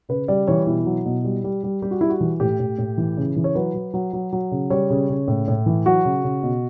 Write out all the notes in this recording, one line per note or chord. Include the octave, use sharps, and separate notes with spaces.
C#3 B4
G3 D5
E3 C#5
B2 E4
F#3
B2
G3
G3
G3
G3 G4
F#4
G3 E4
F#4
E3
A2 G4
A2
A2
E3
C#3
E3
C#5
F#3 B4
F#3
F#3
F#3
F#3
C#3
G3 C#5
C#3
C#3
A2
A2
E3
F#3 F#4
C#3
C#3
B2